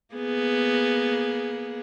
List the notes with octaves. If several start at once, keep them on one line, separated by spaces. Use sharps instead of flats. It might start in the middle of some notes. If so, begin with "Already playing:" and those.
A#3 B3 G#4